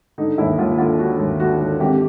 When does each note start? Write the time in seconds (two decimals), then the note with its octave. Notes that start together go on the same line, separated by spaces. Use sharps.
0.18 D3 D#4
0.38 D#2 E4
0.58 D#2 F4
0.78 D3 F4
0.99 D3 F#4
1.19 D#2
1.40 D3 F#4
1.60 D3
1.80 G#1 G4